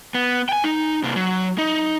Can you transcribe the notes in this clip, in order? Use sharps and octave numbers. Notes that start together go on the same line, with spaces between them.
B3
G5 G#5
D#4
C3 A#3
F#3
D#4